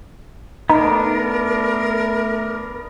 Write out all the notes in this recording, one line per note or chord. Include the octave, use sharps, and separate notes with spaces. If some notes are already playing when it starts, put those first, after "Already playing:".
A3 B3 D4 D#4 A#4